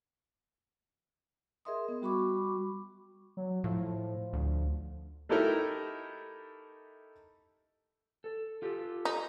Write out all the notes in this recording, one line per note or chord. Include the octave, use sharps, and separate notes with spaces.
G#4 A#4 D#5 E5 C6 D#6
B3
G3 F#4 B5 C#6 D6
F#3
A2 F3
D2
A3 D#4 E4 G4 A4 A#4
A4
F4 G4 A4
D#4